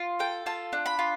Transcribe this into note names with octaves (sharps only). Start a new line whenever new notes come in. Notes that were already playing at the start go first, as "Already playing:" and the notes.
Already playing: F4
A4 G5
F4 A5
D4
B5
F4